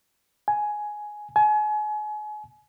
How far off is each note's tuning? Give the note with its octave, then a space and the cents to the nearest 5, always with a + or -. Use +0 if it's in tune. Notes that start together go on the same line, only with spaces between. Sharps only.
G#5 +10
G#5 +35